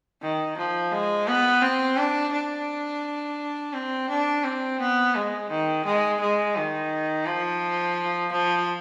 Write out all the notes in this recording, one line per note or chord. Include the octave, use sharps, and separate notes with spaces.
D#3
F3
G#3
B3
C4
D4
D4
C4
D4
C4
B3
G#3
D#3
G#3
G#3
D#3
F3
F3